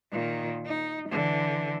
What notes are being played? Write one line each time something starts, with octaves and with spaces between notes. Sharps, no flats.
A#2 D#3
D#4
D3 E3